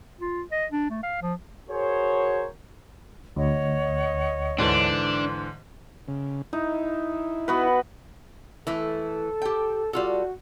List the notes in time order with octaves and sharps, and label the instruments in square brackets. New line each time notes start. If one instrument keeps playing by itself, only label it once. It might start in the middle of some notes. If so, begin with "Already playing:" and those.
[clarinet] F4
D#5
D4
A3
F5
F3
[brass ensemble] F#4 G#4 A#4 C5 C#5
[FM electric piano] D2 [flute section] C#5 D#5 F#5
[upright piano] G#2 D3 E3 [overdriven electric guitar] D4
[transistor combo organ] C#3
[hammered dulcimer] D#4 [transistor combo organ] E4
[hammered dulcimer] B3 F#4 B4
[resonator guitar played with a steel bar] E3 A3 E4 [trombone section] A4
[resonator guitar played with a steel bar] G4 G5
[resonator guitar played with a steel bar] G3 F4 A4 [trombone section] F#4